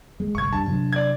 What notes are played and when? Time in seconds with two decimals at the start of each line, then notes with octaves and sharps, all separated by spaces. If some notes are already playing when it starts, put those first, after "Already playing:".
0.20 G#3
0.35 G1 C2 C#6 G#6
0.53 G2 A5
0.68 C3 F#3 D4
0.93 D5 G#6